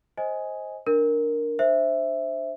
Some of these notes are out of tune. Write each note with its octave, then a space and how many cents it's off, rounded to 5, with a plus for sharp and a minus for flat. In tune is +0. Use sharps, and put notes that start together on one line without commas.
C5 +15 D#5 +15 G#5 +0
D4 +0 A#4 +0
D4 +15 C5 +0 E5 +0